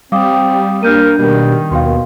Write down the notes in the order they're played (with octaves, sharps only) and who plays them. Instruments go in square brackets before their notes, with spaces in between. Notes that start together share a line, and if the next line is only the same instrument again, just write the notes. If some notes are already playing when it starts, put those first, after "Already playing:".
[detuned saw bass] G3 [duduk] C4 [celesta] F5 D6 D#6
[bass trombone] A#3 [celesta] D4 G6 D#7 [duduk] A#4
[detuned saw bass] B2 [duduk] D#3 [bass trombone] G3
[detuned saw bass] D#2 [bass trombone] B2 [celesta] F5 G5 C6